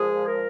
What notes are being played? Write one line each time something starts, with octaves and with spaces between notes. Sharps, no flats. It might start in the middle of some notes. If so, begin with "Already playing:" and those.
Already playing: A#2 F3 G#3 G#4
A#4